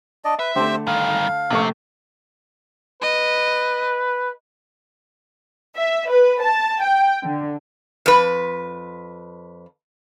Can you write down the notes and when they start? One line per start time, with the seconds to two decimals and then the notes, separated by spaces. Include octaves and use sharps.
0.24 D4 D5 D#5
0.39 B4 E5
0.56 D3 A3 C4 G4 C5
0.87 G2 D#3 F5
1.50 A#1 C3 A3 C#6
3.02 B4 D#5
5.76 E5
6.10 B4
6.42 A5
6.82 G5
7.23 D3
8.06 F2 B4